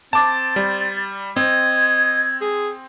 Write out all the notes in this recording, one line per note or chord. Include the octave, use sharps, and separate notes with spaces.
C4 A5 D6 A6
G3
C4 D#5 G#6
G#4